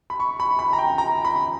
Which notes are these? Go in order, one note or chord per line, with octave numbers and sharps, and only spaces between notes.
B5
C#6
B5
B5
A#5
G5
A#5
B5